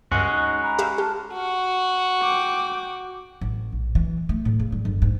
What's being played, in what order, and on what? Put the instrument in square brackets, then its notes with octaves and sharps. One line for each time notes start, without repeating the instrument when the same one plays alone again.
[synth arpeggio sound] C#2 G2 [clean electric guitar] G#3 C#4 F#4 [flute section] F6
[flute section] D#4
A#5 B5
[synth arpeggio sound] G4 E5 F5
[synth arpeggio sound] G4 [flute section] A5 F6 F#6
[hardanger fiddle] F#4
[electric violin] G5 D6
[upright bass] A1
A#1
E3
A3
A2
C#3
G3
G1
G#2